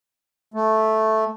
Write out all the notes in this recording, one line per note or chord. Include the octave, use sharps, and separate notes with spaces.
A3